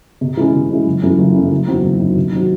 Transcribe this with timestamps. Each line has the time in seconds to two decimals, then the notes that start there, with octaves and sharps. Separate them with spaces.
0.21 C3
0.37 E3 G#3 C#4
0.54 C3
0.70 E3 G#3 C#4
0.86 F#1
1.02 F#2 E3 A3 C#4
1.19 F#1
1.34 F#2 E3 A3 C#4
1.51 F#1
1.67 E2 D#3 F#3 C4
1.84 F#1
1.99 E2 D#3 F#3 C4
2.16 C3
2.32 D#3 F#3 C4 F#4